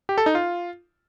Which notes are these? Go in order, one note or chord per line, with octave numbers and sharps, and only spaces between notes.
G4
A4
D#4
F4